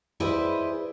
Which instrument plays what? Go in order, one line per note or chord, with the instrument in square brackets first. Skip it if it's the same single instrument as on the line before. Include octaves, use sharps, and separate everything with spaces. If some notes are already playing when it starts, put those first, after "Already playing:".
[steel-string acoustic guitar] E4 G#4 B4 C5 D5 D#5